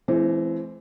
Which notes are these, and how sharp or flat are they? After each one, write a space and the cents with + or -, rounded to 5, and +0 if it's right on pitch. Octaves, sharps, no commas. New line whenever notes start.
E3 +20 A3 -45 C4 +0